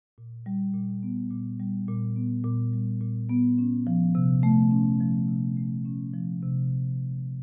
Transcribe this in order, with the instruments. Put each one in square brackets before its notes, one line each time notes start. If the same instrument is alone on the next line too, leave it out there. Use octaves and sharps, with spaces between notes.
[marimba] A#2
G3
A#2
B3
A#2
G3
A#2
B3
A#2
G3
A#2
B3
C#4
F3
C3
A3
C#4
F3
C3
A3
C#4
F3
C3